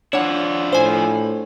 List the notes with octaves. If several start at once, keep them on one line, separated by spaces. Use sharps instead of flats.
F3 D4 E4 C#5 F#5
A2 C5 G#5